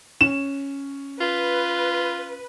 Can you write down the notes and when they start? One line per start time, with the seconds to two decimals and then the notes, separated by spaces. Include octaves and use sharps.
0.21 C#4 E7
1.21 F4 B4